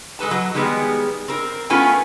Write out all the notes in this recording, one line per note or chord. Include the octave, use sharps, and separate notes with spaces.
G#3 A4 B4 A5
F#3
D#3 G3 G#3 B3 G#4
C4 A#4
A3 B3 C#4 E4 F4 G#5